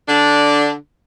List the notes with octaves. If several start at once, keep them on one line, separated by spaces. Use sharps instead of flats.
D3 D4